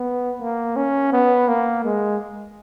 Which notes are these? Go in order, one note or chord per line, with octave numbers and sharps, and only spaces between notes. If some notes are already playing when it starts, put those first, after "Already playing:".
Already playing: B3
A#3
C#4
B3
A#3
G#3